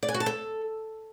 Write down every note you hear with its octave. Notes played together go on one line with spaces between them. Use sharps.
D5
G#5
F#4
A5
A4